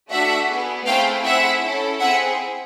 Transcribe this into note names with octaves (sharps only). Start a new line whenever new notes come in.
A3 D4 F#4 A4 E5 F#5
B3 E4 G#4
A3 C4 E4 G#4 F5 G5
C4 E4 G#4 E5 F#5
C#4 E4 A4
C4 E4 G#4 E5 F#5